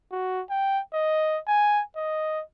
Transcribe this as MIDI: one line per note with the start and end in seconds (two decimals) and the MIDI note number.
0.12 0.42 66
0.50 0.81 79
0.93 1.40 75
1.47 1.83 80
1.96 2.42 75